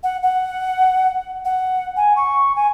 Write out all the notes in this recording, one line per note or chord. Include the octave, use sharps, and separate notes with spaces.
F#5
F#5
F#5
G#5
C#6
G#5